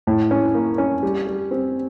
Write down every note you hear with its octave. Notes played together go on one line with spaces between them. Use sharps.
A2
C#4
A#3
C#4
G3
G3
C4